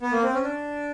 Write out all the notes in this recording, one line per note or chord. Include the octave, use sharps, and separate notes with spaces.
B3
A#3
C4
C#4
D4